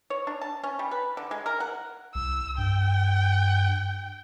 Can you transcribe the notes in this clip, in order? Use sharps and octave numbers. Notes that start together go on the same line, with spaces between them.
C#5
D4
A5
C#4
G3
B4
D3
G#3
A#4
F#5
C2 E6
G2 G5